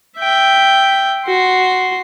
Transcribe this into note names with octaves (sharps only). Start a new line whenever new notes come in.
E5 G5
F#4 C6